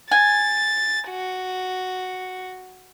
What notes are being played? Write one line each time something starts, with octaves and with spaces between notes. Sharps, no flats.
G#5 A6
F#4